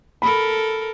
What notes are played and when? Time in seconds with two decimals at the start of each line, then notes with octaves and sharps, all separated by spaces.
0.22 A4 A#4 B5